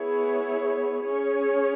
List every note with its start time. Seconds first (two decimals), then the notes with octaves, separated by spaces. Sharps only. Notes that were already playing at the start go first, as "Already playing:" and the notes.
Already playing: B3 E4 G#4 C#5
1.02 C#4 G#4 C#5